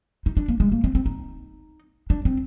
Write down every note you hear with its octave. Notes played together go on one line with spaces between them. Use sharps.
D#4
D4
A#3
G#3
A#3
C4
C4
D#4
D4
C4